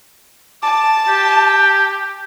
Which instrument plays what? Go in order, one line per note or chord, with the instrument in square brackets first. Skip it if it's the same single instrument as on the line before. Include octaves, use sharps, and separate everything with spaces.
[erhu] A5 [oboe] D6
[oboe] G4